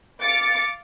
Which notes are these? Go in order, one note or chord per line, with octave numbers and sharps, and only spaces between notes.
F5 D6 A6 C#7